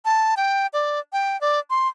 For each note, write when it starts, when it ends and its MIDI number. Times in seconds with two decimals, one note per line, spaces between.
0.05 0.35 81
0.37 0.67 79
0.73 1.00 74
1.13 1.39 79
1.41 1.59 74
1.70 1.88 84